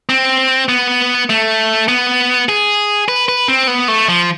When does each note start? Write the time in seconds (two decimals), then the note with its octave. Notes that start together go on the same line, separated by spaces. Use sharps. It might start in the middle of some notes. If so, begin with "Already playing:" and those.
0.09 C4
0.69 B3
1.30 A3
1.88 B3
2.49 G#4
3.08 B4
3.29 B4
3.48 C4
3.67 B3
3.88 A3
4.08 F3